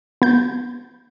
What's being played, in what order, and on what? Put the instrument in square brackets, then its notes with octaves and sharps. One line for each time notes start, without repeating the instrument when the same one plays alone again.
[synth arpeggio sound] B3 G6